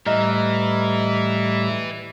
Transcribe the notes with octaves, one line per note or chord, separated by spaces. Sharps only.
A2 E3 G3 D#5 E5 A#5 F6